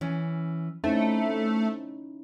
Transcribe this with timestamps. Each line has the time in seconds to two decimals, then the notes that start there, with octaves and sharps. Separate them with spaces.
0.01 E3 C#4
0.84 A3 C4 C#4 D#4 E4